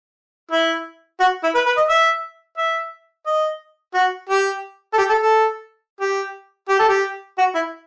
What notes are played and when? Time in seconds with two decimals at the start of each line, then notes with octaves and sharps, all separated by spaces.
0.51 E4
1.20 F#4
1.44 E4
1.55 B4
1.66 B4
1.77 D#5
1.89 E5
2.58 E5
3.26 D#5
3.94 F#4
4.29 G4
4.93 A4
4.98 G4
5.09 A4
5.20 A4
6.01 G4
6.69 G4
6.79 A4
6.88 G4
7.38 F#4
7.55 E4